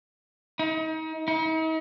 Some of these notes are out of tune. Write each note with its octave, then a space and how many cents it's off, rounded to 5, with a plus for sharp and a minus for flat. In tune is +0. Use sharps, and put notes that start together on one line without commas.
D#4 +35
D#4 +45